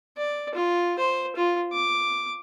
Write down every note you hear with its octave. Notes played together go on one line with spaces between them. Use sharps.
D5
F4
C5
F4
D6